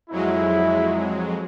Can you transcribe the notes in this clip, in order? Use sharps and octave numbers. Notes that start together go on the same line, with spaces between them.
F2 F#3 G#3 E4